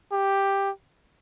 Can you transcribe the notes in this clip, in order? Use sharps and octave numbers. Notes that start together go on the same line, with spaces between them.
G4